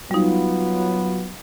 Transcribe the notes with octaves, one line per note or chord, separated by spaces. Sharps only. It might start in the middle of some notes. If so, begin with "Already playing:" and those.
F#3 G3 B3 D#4 F4